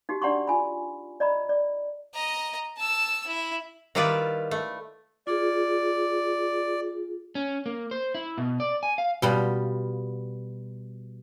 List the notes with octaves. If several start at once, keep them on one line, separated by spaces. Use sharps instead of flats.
D#4 F#4 G4
D4 D5 F#5 A#5 C6 C#6
F4 G#5 B5
D5 D#5 A#5 B5
D5
D#5 A#5
A5 E6
E4
D#3 G3 E4 F4 B4 D5
A3
F4 G#4 D5
C#4
A#3
C5
E4
B2
D5
G#5
F5
B2 G3 F4